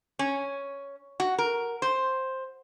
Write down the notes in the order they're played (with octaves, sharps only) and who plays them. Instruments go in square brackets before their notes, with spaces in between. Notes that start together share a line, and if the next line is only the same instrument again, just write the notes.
[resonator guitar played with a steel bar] C#4
F#4
A#4
C5